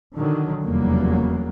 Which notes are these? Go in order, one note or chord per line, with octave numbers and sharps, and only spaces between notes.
D3 D#3 F#3
F1 E2 C#3 F#3 G3 A#3